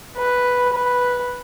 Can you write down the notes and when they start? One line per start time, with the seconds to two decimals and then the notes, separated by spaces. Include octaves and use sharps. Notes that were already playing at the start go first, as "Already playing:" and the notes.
0.18 B4
0.73 B4